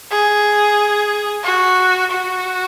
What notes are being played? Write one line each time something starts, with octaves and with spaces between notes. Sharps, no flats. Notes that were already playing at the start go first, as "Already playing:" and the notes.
G#4
F#4
F#4